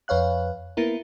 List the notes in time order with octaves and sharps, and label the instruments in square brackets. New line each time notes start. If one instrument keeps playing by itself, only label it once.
[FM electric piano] F2 B4 C#5 F5 F#6
A#3 B3 E4 A#4